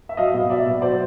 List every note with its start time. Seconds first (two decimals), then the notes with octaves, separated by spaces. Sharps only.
0.09 E5
0.17 F#3 D#5 F5
0.34 B2
0.50 F#3 D5 E5
0.66 B2
0.82 F#3 C5 D5